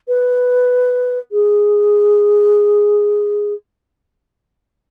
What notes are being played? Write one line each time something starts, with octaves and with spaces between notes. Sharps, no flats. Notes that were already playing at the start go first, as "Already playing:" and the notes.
B4
G#4